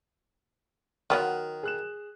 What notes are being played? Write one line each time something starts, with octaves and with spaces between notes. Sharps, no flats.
D#3 F#3 B3 F4 F6 F#6
G#4 F#6 E7